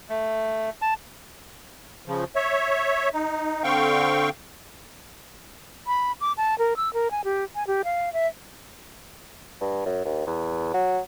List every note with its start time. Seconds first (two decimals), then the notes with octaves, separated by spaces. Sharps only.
0.09 A3
0.82 A5
2.06 C#3 F3
2.36 C#5 E5
3.13 D#4
3.64 D3 C4 F5 G5 C#6
5.87 B5
6.21 D6
6.37 A5
6.59 A#4
6.77 E6
6.94 A#4
7.11 G#5
7.25 G4
7.55 G#5
7.67 G4
7.84 F5
8.13 E5
9.61 G2
9.86 F#2
10.05 D#2
10.27 E2
10.74 F#3